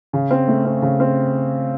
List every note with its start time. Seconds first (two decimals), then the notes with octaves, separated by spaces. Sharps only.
0.13 C#3
0.31 C4
0.48 A3
0.65 C4
0.82 C#3
1.00 C4